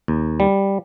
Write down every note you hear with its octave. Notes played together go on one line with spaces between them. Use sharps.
D#2
G3